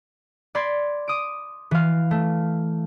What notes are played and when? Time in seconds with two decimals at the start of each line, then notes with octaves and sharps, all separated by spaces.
0.55 D5 B5 C6 G#6
1.08 D6 D#6 D7
1.71 E3 F5
2.11 A3